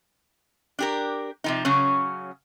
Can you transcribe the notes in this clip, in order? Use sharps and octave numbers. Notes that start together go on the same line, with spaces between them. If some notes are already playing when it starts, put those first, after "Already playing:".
D4 G4 A#4
C3 F3 D#4
C#3 F#3 C#4